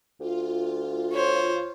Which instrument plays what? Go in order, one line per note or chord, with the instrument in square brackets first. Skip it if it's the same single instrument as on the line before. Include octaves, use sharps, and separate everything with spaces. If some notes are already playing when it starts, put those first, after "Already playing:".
[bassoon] D2 [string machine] F4
[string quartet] C5 C#5